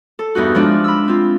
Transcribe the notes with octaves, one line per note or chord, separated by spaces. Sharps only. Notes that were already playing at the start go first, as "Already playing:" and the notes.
A4
E2 G2 D#4 F#4
F3 G#3 D4
B5 E6
C4 F4